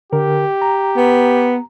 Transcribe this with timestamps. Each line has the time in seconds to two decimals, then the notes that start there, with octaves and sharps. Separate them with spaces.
0.13 D3 G4 A#4
0.62 A#5
0.97 B3